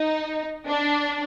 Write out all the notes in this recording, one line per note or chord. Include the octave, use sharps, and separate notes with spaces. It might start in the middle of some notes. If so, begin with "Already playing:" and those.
Already playing: D#4
D4